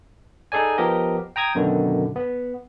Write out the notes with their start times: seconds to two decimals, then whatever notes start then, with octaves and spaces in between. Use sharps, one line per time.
0.52 D#4 G#4 A4 D5 G#5
0.78 F3 B3 G4 A#4 D#5
1.36 G5 A#5 D#6 G#6
1.55 F#2 B2 D3 D#3
2.16 B3